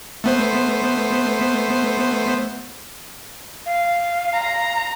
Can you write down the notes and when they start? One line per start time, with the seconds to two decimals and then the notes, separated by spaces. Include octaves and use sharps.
0.24 A3 B3 C5
3.66 F5
4.34 A#5